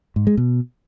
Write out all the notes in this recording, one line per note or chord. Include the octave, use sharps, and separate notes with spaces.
G#2
G#3
B2